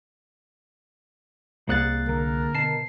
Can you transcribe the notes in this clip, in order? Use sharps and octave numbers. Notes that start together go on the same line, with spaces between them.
C2 G3 A#3 G#4 F#5 F#6 A6
D3 A#4
B2 A5 C7